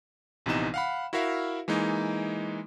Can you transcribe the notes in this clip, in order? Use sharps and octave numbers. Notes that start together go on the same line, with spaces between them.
A#1 C3 E3 B3 D#4 E7
F5 F#5 B5
E4 F#4 A#4 E5 F5
E3 G#3 A#3 D#4